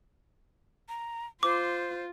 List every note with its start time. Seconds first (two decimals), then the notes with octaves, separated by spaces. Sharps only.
0.88 A#5
1.43 F4 C5 D6